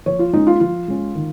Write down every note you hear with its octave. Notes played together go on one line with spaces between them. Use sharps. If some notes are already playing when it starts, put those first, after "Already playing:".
F3 C#5
F4
G#3 C#4 D#4
F4
F3 F4
G#3 C#4
D#3